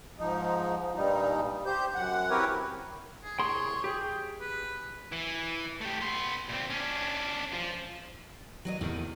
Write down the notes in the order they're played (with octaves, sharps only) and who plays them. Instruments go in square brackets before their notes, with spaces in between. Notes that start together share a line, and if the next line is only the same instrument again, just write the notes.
[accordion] G#2 F3 D#4
G2 A#2 G3 D#4
G4 C5 G6
F#2 F#5
C4 E4 G4 A#4 B4 C#5
[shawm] G#4
[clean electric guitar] C2 G#4 C6 [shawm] C#5
[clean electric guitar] G4 G#4 [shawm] G5
[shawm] B4
[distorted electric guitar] E3
A3 G4
B3 C6
A#2 C4
C#4 D4
F3
[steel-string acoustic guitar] F#3 C#5 D#5
[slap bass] E2 A2 D#3 [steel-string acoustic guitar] C3